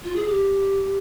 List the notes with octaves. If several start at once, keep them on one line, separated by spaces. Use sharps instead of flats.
F4
G#4
G4